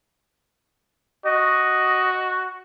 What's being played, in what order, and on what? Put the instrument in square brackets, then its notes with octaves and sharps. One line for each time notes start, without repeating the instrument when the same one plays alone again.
[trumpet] F#4 [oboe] D#5